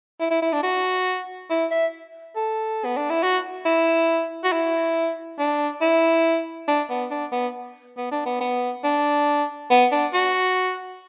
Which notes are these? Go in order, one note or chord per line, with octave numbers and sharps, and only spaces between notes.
E4
E4
E4
D4
F#4
E4
E5
A4
B3
D4
E4
F#4
E4
F#4
E4
D4
E4
D4
B3
D4
B3
B3
D4
B3
B3
D4
B3
D4
F#4